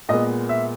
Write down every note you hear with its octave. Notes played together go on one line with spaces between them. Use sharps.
A#2 G#3 B3 D#5
E5